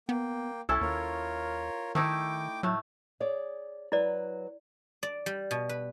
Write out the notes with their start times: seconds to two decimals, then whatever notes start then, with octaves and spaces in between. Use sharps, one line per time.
0.09 A#3 B3 G5
0.69 C2 C#4 E4 A4
0.81 D#2 F4 A#4 C#5
1.95 D#3 A3 D#4 E4 G5 D6
2.63 A2 F#3 A3
3.20 G#4 C#5 D5
3.92 F#3 E4 B4 D5
5.03 D5
5.26 G3
5.51 B2
5.69 B4